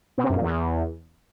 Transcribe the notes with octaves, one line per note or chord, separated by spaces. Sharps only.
B2
C3
F#2
A#2
E2